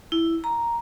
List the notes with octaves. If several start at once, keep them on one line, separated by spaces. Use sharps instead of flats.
E4
A#5